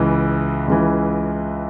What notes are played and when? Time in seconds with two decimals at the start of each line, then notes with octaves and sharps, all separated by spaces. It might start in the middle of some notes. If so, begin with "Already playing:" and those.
Already playing: C#2 C#3 E3
0.68 C#2 C#3 E3